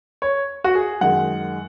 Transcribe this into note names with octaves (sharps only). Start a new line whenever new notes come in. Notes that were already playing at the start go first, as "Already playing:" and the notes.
C#5
F#4
G#4
F#2 D#3 G#3 F#5